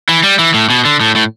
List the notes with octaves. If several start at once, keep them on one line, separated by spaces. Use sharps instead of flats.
E3
G3
E3
A2
B2
D3
A2
A2